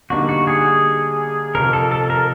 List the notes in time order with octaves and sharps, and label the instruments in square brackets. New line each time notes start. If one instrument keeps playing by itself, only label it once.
[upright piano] D3 G3 A#3 D#4 [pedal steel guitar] F#4
[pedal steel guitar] F#4
G#4
[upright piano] F2 C3 F3 [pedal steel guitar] A#4
[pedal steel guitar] A4
A4
A#4